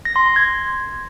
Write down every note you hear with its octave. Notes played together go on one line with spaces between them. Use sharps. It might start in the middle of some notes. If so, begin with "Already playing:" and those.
A#6
C6
C6
G#6